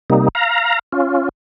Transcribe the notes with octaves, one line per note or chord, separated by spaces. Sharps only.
C3 G3 A#3 D#4
F5 A#5
C#4 F4